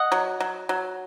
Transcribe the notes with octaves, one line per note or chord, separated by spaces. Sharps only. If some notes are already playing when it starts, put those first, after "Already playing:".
Already playing: D#5 F#5
F#3
F#3
F#3